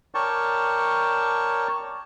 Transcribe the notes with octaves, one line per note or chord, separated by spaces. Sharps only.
A#4 C#5 D5 G5 A5 C#6